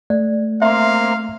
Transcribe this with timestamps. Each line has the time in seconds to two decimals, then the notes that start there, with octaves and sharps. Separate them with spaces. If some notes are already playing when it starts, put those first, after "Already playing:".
0.10 A3 D5
0.62 A#3 C4 E5 F5 C6